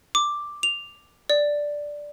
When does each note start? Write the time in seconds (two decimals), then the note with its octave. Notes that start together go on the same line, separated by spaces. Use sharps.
0.15 D6
0.63 F7
1.30 D5